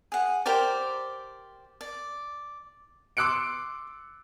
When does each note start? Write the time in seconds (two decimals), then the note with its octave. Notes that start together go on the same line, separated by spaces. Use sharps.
0.12 G#4 F#5
0.46 G4 A#4 C5 D5
1.81 D5
3.17 C6 D6 E6 F#6 C#7 D7